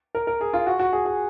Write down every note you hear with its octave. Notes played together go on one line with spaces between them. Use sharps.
A#4
A#4
G#4
F4
F#4
F#4
G#4
G#4